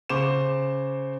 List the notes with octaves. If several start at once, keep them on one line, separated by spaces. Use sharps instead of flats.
C#3 C5 C#6 D6 E7